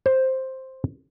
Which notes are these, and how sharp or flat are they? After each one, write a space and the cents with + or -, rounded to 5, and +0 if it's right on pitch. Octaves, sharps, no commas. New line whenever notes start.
C5 +5